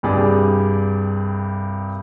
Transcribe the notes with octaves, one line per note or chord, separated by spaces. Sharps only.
C2 G2 G4 G#4 D5 D#6